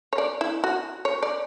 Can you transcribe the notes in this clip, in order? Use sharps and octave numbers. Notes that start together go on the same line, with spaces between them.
C#5
D5
E4
F#4
C#5
D5